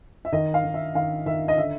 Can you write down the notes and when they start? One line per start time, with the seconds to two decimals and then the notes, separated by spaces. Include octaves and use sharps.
0.25 E5
0.33 D#3 D#5
0.54 F5
0.64 D#3
0.74 E5
0.95 D#3 F5
1.26 D#3 E5
1.48 D#5
1.58 D3 E5